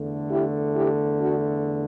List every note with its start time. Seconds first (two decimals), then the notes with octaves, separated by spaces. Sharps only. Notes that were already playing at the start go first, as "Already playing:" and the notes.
Already playing: E2 D3 A3
0.31 E4 G4
0.76 E4 G4
1.20 D4 F#4